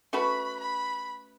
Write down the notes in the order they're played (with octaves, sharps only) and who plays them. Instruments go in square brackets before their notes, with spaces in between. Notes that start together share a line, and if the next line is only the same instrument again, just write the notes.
[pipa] A3 C#4 F#4 B4 [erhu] B5
[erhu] B5